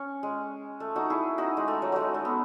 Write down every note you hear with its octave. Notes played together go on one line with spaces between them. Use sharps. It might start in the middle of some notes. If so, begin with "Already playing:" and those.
Already playing: C#4
G#3
A3
D#4 F#4
E4 G#4
D#4 F#4
G#3
A3
F#3
F#3 G#3
A3
B3